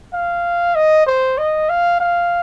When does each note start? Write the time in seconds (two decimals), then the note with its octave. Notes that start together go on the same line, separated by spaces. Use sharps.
0.13 F5
0.75 D#5
1.06 C5
1.38 D#5
1.69 F5
2.00 F5